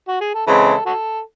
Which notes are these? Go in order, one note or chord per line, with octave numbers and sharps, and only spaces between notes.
F#4
G#4
A4
C#3 E3 G#3 C4 A4
F#4 A4